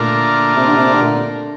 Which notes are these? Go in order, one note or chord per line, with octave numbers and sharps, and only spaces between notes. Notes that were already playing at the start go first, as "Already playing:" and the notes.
Already playing: A#2 D3 A3 D4 F4 A#4
C3
D3
C3
D3